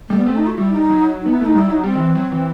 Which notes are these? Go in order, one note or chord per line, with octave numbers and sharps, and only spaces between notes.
G3 A3
B3
A3 C4
D#4
F#4
G3 E4
D#4
F#3
D#4
B3
E4
A3 D#4
G3 E4
F#3 D#4
G3 C4
D#3
E3
F#3
E3